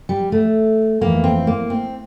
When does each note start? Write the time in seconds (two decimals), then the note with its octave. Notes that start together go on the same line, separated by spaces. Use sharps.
0.09 G3
0.32 A3
1.01 F2 E3 A#3
1.24 C4
1.47 A#3
1.70 C4